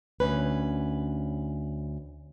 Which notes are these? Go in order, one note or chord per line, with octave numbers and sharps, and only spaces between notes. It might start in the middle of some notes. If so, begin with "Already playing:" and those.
D2 C#4 B4